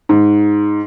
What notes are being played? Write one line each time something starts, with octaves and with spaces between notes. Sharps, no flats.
G#2